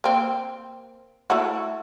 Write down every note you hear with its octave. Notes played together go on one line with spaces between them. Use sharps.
A#3 C4
A3 E4 F#4